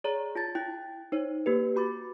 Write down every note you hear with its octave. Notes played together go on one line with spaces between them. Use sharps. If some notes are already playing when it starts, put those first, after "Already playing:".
G#4 C#5 D5 A#5
F4 A5 A6
E4 G5 G6 A6
D#4 C5 C#5
A#3 G4 B4
F#4 B5 D6 A6